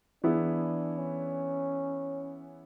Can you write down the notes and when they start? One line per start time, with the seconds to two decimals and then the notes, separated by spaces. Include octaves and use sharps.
0.24 E3 B3 D4 E4 G#4
0.98 C#4